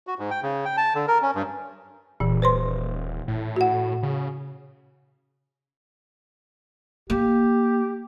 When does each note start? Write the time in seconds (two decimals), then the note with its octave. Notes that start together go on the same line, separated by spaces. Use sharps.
0.07 F#4
0.19 G#2
0.31 G5
0.43 C#3
0.65 G5
0.77 A5
0.95 D3
1.08 A#4
1.22 C#4
1.35 G2
2.20 D#1 A#2 E3
2.42 B4 C5 C6
3.28 A2
3.56 F#4 F#5
4.03 C#3
7.10 A#3 G4